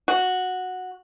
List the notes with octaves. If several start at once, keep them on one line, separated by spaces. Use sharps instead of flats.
F#4